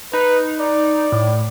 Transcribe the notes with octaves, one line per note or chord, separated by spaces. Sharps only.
D#4 B4
D5
A2